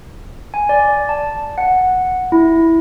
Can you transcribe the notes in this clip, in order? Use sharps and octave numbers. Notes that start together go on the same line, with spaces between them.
G#5
D5
A5
F#5
E4